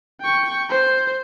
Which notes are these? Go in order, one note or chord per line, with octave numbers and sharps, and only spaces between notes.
G5 C#6
C5